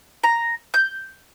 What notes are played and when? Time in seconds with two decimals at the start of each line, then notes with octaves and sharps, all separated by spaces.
0.23 A#5
0.74 G6